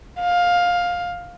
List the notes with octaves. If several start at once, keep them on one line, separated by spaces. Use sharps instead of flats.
F5